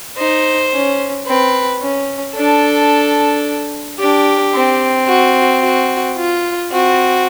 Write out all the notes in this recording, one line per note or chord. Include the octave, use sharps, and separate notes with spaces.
D#4 C5
C#4
C4 B4
C#4
D4 A4
D4 G4
C4
F#4
F#4
F4
C4 F#4